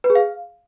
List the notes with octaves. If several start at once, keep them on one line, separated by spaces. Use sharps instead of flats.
B4
G#4
F5